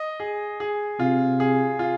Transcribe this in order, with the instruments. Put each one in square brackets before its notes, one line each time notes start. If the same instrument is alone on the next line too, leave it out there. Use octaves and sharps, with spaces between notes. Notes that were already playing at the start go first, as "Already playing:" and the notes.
Already playing: [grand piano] D#5
G#4
G#4
[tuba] C3 [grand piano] F4
[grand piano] G#4
F4